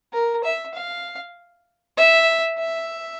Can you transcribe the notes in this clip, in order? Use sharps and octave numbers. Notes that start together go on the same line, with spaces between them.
A#4
E5
F5
E5
E5